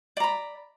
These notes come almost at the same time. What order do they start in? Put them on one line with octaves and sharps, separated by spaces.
D5 A#5 B5